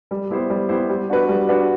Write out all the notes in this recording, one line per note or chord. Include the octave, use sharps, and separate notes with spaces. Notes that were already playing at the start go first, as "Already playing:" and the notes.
G3
B3 E4 G4 C5
G3
B3 E4 G4 C5
G3
D4 F#4 B4
G3
D4 F#4 B4